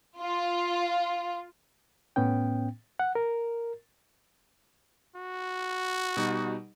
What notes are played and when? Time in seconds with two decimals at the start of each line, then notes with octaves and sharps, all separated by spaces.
0.20 F4
2.16 A2 B3 C#4 G5
2.99 F#5
3.15 A#4
5.16 F#4
6.17 B2 G3 D#4